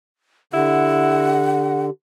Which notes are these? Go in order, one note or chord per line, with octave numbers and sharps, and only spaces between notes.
D3 E4 G4 F#5